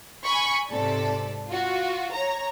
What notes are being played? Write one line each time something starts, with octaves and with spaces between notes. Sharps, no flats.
G#5 B5 C#6
G#2 C3 A4 D5
F4 F#4
C#5 A#5